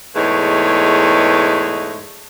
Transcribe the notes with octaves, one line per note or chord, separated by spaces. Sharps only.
E2 G#2 A3 C#5 D#5